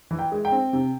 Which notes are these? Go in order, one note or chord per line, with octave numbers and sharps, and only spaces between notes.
E3
G5
G#3
G5
C4
C3